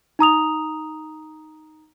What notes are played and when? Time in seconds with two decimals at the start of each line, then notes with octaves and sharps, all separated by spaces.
0.19 D#4 A#5 D#6 F7